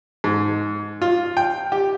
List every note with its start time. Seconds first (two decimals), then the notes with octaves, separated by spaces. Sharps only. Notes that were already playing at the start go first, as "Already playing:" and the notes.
0.24 G#2
1.02 F4
1.37 G5
1.72 G4